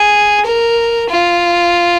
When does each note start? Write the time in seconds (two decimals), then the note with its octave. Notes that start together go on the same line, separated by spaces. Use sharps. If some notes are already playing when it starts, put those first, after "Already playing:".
Already playing: G#4
0.46 A#4
1.10 F4